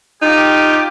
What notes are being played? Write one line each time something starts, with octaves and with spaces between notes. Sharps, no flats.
D#4 F4 G4